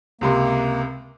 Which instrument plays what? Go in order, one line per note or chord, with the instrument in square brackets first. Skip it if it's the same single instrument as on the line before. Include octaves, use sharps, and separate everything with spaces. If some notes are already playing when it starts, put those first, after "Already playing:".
[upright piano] C#2 C3 C6 [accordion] A#3